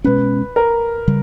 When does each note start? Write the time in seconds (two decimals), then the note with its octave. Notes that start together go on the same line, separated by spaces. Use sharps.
0.04 B2 G#3 C#4 B4
0.56 A#4
1.08 C#3 G3